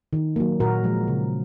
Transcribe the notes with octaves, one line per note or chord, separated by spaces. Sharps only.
D#3
F#3 A#3
A#2 F#4 A#4
F3 G#3
C#3